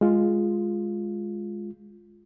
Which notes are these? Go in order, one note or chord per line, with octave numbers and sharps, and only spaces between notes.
G#3 F4